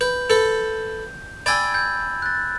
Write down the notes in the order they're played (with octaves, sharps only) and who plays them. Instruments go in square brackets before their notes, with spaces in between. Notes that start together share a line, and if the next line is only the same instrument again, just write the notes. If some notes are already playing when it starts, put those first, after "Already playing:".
[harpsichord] B4 [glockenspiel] G6
[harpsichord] A4 B4
[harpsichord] D5 G5 G#5 [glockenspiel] B5 E6 G#6
[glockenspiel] G6
F#6 A6